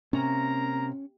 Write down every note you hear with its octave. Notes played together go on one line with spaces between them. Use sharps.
C3 A#3 C#4 A#5